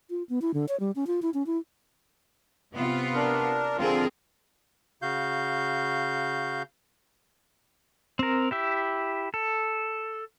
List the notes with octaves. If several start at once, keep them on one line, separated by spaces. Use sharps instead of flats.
F4
B3
E4
D3
C#5
G3
C#4
F4
E4
C#4
E4
C3 B3 F4
D4 A#4
D3 F3 C4 F4 G#4 A#4
C#3 F#4 F5 G6
C4 A#4
E4 G4 E5
A4